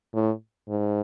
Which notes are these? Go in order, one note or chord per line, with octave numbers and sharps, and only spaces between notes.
A2
G#2